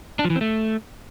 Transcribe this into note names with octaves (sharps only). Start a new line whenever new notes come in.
D4
F3
E3
C4
A3